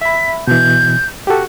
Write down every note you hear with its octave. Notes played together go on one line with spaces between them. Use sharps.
E5 B5 B6
B2 E3 G6
F#4 G4 A4